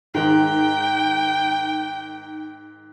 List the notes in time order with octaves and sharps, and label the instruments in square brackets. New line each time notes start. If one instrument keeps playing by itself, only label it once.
[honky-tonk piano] G#2 D#3 [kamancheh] G5